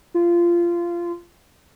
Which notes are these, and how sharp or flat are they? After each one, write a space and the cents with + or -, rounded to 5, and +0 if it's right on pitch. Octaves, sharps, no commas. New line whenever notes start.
F4 -20